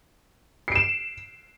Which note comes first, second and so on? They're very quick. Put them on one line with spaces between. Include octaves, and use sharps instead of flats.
C7 D7 E7